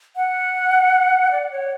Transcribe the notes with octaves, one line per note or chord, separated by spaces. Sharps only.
F#5
D5
C#5